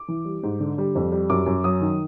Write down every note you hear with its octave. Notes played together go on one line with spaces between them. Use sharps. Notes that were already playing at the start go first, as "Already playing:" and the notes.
Already playing: D6
E3
G3
G#2
D3
G3
F2
G3
F#2 D6
F#2
F#3 D#6
D#3